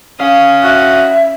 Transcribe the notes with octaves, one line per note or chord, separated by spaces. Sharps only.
C#4 F5 D#6
F#4 E5